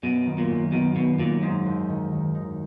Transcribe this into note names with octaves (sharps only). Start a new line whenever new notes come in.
F#2 B2
D#3
A#2
F#2
B2 D#3
F#2 B2
F#2 A#2
G#2 D#4
D#2
D#3
D#3
D#4